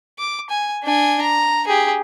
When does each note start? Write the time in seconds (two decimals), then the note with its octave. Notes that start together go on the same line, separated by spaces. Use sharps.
0.19 D6
0.50 G#5
0.84 D4 G#5
1.22 A#5
1.67 G4 G#4